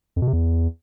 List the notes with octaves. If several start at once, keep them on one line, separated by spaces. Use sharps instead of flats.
F2
B2
C3
E2